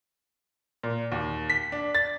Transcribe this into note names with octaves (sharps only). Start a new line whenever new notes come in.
A#2
D#2
B6
D4
A6